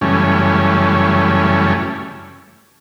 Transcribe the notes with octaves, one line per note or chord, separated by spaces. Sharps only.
F#2 C#3 E3 G3 A3 C#4